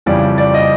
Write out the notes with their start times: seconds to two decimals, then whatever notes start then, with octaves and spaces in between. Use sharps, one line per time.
0.06 F2 C#3 E3 G3 D5
0.38 D5
0.54 D#5